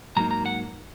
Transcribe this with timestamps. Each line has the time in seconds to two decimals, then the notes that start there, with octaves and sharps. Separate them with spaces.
0.16 G#2 F#3 A#3 D#4 A#5
0.31 A#5
0.46 F#5